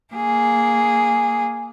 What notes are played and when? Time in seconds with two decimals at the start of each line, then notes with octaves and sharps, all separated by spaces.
0.13 A#3 G#4